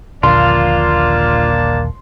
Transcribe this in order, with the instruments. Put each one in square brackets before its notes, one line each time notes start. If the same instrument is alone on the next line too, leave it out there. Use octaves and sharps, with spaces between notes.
[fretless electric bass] D#1 A#1 D3 [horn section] A#3 D4 A5 [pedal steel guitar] F4 [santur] C6